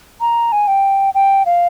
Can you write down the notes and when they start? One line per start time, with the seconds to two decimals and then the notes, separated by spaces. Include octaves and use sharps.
0.20 A#5
0.52 G#5
0.67 G5
1.14 G5
1.46 F5